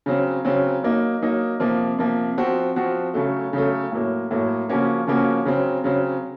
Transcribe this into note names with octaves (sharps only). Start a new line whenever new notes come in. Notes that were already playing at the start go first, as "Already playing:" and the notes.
C#3 F#3 C4
C#3 F#3 C4
F#3 A#3 D#4
F#3 A#3 D#4
C3 F3 A#3
C3 F3 A#3
F3 C4 F#4
F3 C4 F#4
C#3 F#3 A3
C#3 F#3 A3
A2 F#3 A#3
A2 F#3 A#3
C#3 F3 A#3 C#4 F#4
C#3 F3 A#3 C#4 F#4
C#3 F#3 C4
C#3 F#3 C4